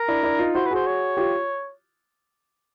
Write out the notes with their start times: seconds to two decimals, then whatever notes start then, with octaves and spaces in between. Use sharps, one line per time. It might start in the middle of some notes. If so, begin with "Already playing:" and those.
Already playing: A#4
0.08 D4 E4
0.23 D4 E4
0.39 D#4 F4
0.54 E4 F#4 C5
0.66 B4
0.71 F#4 G#4 C5
0.87 C#5
1.17 F4 G4